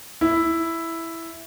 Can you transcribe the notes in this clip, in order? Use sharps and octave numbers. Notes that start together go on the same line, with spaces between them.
E4